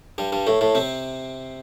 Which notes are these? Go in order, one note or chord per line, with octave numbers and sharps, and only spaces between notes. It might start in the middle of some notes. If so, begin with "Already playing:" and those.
G2 G3
G2 G3
A2 A3
A2 A3
C3 C4